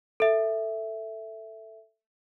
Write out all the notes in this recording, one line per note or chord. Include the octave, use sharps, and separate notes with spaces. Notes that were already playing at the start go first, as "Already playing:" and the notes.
A4 E5